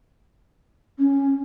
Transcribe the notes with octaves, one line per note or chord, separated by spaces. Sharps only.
C#4